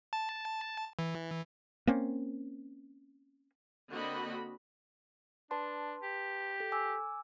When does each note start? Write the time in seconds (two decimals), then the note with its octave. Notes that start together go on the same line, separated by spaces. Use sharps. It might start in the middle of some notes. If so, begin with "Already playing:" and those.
0.13 A5
0.99 E3
1.87 A#3 C4 C#4
3.91 D3 A#3 C4 F#4 D#5 B5
5.51 D4 B4 A5 C6
6.02 G4
6.60 A4
6.72 G#5 D6 E6